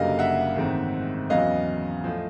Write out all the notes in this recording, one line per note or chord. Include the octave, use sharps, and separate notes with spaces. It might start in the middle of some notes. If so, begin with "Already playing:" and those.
Already playing: F#1 F#2 D3 G3 A#3 D#5 F5
E5 F#5
A1 G#2 D#3 G#3 C4
E2 C#3 F#3 B3 D#5 F5
A2 F3